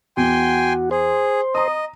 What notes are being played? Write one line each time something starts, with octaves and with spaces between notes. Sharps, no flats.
E2 F#4 G5 G#5 C6
G#4 C5
D#5 A#5 D#6